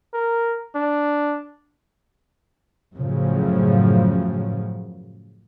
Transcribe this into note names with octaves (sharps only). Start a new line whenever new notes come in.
A#4
D4
F#2 A2 C#3 F3 F#3